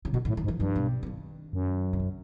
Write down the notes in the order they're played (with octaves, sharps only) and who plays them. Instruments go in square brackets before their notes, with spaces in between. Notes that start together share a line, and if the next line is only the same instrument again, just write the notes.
[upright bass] C#3
[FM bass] B2 [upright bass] D3
[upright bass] D#3
[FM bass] A2
[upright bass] D#3
[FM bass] G#2
[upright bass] E3
[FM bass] G2 [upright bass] F3
[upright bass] B2
D3
D#3
[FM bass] F#2
[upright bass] C#3
D3